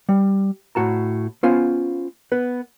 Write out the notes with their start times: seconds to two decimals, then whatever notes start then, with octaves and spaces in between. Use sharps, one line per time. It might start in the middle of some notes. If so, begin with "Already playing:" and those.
0.09 G3
0.75 A2 F#4 A5 A#5
1.43 B3 C#4 F4 C5 F5 G#5
2.32 B3 B4